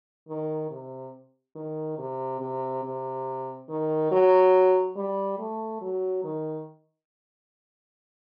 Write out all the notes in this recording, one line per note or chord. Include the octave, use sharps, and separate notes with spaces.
D#3
C3
D#3
C3
C3
C3
D#3
F#3
G3
A3
F#3
D#3